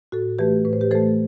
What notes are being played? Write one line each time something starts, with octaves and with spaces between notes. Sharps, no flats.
A2 F#4 A4
E3 A3 G4 B4
A2 B4
C5
G4 B4
E3 A3 A4 C5